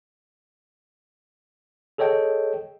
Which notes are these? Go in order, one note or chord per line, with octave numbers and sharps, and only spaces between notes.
G#4 A4 C#5 D#5 G5